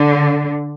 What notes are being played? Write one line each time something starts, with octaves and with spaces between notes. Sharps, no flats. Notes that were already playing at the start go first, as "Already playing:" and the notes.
Already playing: D3